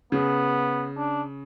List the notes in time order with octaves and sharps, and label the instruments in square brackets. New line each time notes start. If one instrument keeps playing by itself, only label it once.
[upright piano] C#3 [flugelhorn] B3
[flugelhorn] D4